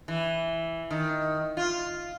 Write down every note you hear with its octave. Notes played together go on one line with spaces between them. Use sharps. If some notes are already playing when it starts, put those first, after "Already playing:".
E3
D#3
F4